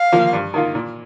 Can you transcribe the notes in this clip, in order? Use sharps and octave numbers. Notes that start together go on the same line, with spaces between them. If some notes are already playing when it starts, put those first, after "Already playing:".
Already playing: F5
F3 A#3 F4
G2
D#3 A#3 F4
A#2